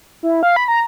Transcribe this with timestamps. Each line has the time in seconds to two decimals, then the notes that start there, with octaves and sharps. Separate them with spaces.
0.23 E4
0.43 F5
0.56 B5
0.68 A#5